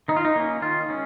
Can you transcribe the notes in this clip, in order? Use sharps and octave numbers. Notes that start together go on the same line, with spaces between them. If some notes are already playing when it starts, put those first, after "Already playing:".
D#3 D#4
F4
D#4
A#3 C#4
D#3 F4
G#3 C#4